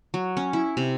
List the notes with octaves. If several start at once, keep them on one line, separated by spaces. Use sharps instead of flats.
F#3
C#4
E4
C3